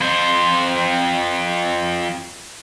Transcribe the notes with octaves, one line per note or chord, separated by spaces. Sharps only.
F2 C5